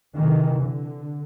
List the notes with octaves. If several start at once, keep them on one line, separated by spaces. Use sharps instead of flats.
C3 D#3 E3
D3